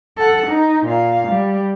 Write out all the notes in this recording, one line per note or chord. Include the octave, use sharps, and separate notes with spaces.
A4 F#5
D#4
A#2 F5
G3